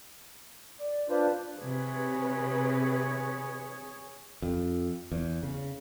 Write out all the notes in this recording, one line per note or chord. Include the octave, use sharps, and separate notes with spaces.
D5
D4 F4 B4 C5
C3 G#4 B4 C#5
F2
E2
C#3